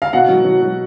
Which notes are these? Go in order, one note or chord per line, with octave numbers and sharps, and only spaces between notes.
F5
B2 F#5
F#3
F#3
F#3